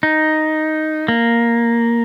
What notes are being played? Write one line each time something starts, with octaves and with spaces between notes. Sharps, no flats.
D#4
A#3